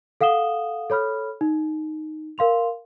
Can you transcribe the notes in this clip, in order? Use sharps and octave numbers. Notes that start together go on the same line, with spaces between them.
A4 F5 F#5 D#6 E7 G7
A4 C#5 B5 F6
D#4
A#4 F5 C6 F7